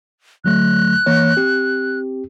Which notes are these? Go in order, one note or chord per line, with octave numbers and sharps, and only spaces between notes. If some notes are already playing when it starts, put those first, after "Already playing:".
D3 F#3 A3 F#6
E3 A#3 C#5
C4 G4